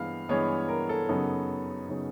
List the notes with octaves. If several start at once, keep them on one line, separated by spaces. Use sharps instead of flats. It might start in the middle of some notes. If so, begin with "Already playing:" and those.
Already playing: G2 E3 G#3 B3 F5
G2 E3 G#3 B3 C#5
A#4
A4
F#2 C#3 F#3 B3 D#4
C#3 F#3 B3 D#4